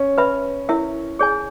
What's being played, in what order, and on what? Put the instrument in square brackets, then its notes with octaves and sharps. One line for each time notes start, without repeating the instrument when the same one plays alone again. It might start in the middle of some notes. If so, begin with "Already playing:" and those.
Already playing: [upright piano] C#4
[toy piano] B4 E5 B5
E4 A#4 E5
G#4 C#5 G#5